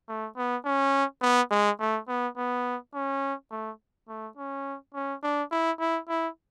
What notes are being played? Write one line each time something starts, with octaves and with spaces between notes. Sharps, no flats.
A3
B3
C#4
B3
G#3
A3
B3
B3
C#4
A3
A3
C#4
C#4
D4
E4
E4
E4